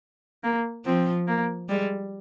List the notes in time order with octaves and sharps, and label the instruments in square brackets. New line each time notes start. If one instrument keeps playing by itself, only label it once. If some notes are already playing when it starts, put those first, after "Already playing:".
[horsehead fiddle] A#3
[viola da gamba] F3 [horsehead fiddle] C4
[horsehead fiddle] A#3
[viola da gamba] G3 [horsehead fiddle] G#3